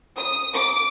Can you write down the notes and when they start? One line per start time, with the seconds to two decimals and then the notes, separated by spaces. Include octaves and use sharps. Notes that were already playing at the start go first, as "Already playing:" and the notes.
0.18 D#6
0.54 D6